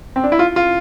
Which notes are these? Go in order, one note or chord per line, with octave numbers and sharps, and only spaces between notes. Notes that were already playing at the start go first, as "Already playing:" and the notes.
C4
D4
E4
F4
F4